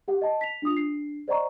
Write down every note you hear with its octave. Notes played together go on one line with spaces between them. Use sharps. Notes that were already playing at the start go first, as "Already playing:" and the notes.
G4 F#5
D#5 A5
B6 F7
D4 F4 D#6 F7
D4 C7
C5 D5 D#5 F#5 A#5 C#6